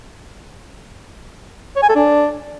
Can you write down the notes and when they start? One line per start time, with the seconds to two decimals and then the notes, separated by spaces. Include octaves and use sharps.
1.76 C#5
1.83 G#5
1.89 A4
1.96 D4